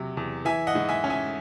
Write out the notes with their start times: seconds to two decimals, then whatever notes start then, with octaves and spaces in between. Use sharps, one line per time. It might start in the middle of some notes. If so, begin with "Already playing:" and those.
Already playing: E2 C3 F#3
0.17 E2
0.45 E3 E5 G#5
0.67 D#5 F#5
0.75 G#2
0.89 E5 G#5
1.04 C#4
1.10 E5 G#5